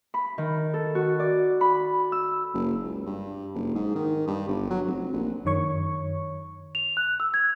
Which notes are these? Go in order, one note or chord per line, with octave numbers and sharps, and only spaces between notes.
B5
D#3
A4
F#4
D5
B5
E6
F#1
C#2
G2
F#1
G#2
D#3
G2
G1
F#3
F1
A#1
F#2 D#3 C#5 C#6
F7
F#6
E6
G#6